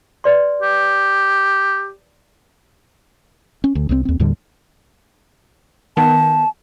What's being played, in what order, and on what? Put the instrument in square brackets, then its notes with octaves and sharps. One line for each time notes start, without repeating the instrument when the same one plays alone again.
[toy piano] B4 D5 C6
[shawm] G4
[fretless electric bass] C#4
D2
C2 C3 F3 C4
D#2 C4
D#2 A2 D3 G3
[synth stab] D#3 B3 [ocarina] A5